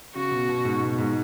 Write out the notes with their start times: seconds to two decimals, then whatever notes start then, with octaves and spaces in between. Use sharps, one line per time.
0.15 C#3 F#4
0.31 B2
0.49 B2
0.65 G#2
0.81 B2
0.98 G#2